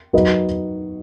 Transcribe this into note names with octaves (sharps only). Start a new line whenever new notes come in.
F#3 D#4 F#4 B4 D#5